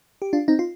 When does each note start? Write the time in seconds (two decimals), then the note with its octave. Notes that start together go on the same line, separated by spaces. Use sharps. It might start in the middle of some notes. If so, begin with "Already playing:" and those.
0.22 G4
0.33 D4 F4
0.48 C4 D#4
0.59 F4